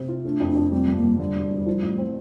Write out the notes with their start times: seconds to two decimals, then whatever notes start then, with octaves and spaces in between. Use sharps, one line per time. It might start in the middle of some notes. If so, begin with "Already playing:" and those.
Already playing: C3 C4
0.08 F4
0.24 A3 D4
0.40 F2
0.48 D4
0.55 F2
0.72 G3 C4
0.87 G2
0.96 A#3
1.04 G2
1.19 D3 G3
1.35 E1
1.51 E1
1.67 F3
1.82 A1
1.98 C4